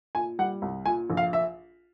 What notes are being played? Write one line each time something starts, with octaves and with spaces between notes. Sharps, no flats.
A#2 G#5
G3 F#5
C2
A#2 G#5
A#1
F5
E5